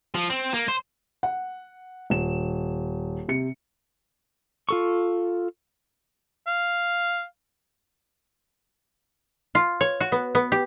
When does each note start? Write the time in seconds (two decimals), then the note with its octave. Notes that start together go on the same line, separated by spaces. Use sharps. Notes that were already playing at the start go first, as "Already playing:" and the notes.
0.15 F3
0.30 C4
0.54 A#3
0.68 C5
1.23 F#5
2.10 D#1 E7
3.28 C3 C#7
4.69 F4 A4 C#6
6.47 F5
9.55 F4
9.81 C#5
10.00 F#4
10.12 B3
10.35 B3
10.52 G4